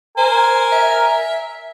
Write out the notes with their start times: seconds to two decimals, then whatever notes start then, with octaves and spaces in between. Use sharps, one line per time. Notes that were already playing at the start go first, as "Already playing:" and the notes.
0.18 A#4 C5 G#5
0.72 E5